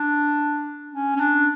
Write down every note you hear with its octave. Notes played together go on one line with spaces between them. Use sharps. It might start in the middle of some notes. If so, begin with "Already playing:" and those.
Already playing: D4
C#4
C#4
D4